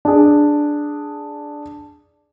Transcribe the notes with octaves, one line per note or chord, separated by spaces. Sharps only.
D4 G#4